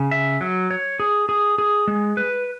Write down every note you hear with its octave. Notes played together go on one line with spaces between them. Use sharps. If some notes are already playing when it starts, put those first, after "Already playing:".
Already playing: C#3
E5
F#3
C#5
G#4
G#4
G#4
G#3
B4